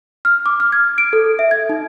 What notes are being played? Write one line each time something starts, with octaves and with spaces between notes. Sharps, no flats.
F6
D6
F6
G#6
D7
A4
E5
G#6
D#4